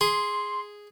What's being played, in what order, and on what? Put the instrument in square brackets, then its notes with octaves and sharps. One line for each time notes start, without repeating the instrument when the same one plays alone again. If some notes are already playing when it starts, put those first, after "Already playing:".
[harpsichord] G#4 [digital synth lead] C6